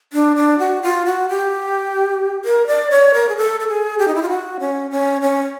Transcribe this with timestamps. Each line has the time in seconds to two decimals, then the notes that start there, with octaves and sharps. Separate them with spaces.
0.13 D4
0.36 D4
0.59 F#4
0.82 F4
1.06 F#4
1.29 G4
2.45 A#4
2.67 D5
2.91 C#5
3.14 A#4
3.29 G#4
3.37 A4
3.60 A4
3.68 G#4
3.99 G4
4.08 D#4
4.15 E4
4.22 F4
4.30 F#4
4.60 C#4
4.91 C#4
5.22 C#4